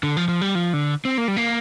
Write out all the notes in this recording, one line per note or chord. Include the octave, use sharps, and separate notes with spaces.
D3
F3
F3
G3
F3
D3
C4
A#3
G3
A#3